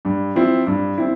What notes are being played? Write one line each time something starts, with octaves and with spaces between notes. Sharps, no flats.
G2
F3 C4 E4
G2
C4 E4